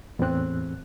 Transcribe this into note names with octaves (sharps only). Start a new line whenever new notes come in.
E2 A2 E3 C4 F#6